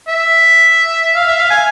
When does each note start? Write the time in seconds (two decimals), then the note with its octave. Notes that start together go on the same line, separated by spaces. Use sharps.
0.08 E5
1.16 F5
1.27 E5
1.38 F5
1.50 G#5